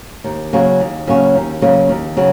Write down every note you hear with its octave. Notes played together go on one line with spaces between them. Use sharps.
D#2
C#3 F#3 A#3 C#4
D#2
C#3 F#3 A#3 C#4
D#2
C#3 F#3 A#3 C#4
D#2
C#3 F#3